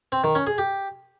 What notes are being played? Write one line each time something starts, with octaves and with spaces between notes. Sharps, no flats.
C4
D#3
C#4
G#4
G4